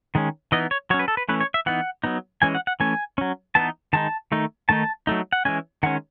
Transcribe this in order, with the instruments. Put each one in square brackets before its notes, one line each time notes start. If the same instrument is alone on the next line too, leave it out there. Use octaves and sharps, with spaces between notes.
[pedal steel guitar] D#3 G#3 C#4
E3 B3 D#4 D#5
C#5
F#3 C#4 C#5
B4
A4
B4
E3 A3 C#4 B4
C#5
E5
E3 B3 D#4 F#5
F#3 B3 D#4
E3 G#3 C#4 G#5
F#5
F#5
E3 A3 C#4 G#5
F#3 C#4
E3 B3 D#4 A5
D#3 G#3 D#4 A5
D#3 A3 D#4
D#3 A3 D#4 A5
F#3 A3 D#4
F#5
E3 G#3 C#4 G#5
D#3 G#3 C#4 F#5